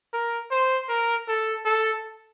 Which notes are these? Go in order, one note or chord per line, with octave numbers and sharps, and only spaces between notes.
A#4
C5
A#4
A4
A4